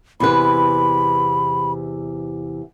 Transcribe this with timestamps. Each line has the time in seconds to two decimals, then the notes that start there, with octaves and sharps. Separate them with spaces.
0.20 E2 C3 B4 B5